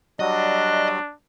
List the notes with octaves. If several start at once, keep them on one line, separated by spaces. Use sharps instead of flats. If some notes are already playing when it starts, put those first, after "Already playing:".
F#3 G3 D4 F#4 D#5